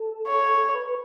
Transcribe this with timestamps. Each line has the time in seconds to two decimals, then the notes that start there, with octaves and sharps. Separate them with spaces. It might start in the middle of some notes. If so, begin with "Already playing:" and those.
Already playing: A4
0.27 C#5
0.75 B4